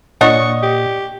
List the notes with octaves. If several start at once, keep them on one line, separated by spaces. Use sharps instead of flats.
A#2 D4 C#5 D#5 F#5 C#6
G4